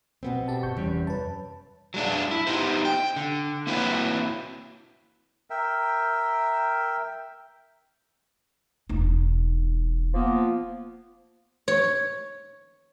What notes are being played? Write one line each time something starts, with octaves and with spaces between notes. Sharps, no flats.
B2 B3 C4
G4 A5
G1 C#6 G6
E2 C3 G3 C#4
F#2 B4 A5
F#3 G#3 D4
E4
B3 D#4 G4 C5
G5
D3
A#3 C4 E4 F#4 B4 C#5
A#4 E5 G5
E1 D#4
F3 A#3 B3
C#5